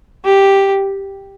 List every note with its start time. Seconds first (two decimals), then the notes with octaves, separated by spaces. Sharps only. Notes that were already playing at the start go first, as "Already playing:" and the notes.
0.25 G4